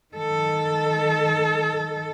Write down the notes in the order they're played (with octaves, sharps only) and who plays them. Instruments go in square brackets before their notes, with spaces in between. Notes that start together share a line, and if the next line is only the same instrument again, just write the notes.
[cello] D#3 A4